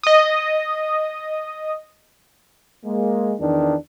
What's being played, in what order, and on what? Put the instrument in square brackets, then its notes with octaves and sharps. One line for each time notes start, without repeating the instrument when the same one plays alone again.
[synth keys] D#5 D#6
[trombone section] G#3 A#3
E2 D#3 D4